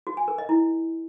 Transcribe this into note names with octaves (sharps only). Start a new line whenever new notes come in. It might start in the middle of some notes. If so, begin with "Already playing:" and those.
F#4
G#5
A#4
D#5
E4